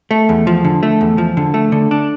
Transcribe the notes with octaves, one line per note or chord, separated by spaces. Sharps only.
A3
E2
F3
D3
A3
E2
F3
D3
A3
D3
D4